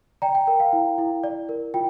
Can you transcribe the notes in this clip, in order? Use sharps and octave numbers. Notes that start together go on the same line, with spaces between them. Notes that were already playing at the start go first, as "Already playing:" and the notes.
D5 G5 A#5
G5
A#4 G5
F5
E4
E4
D5
A#4
F4 G5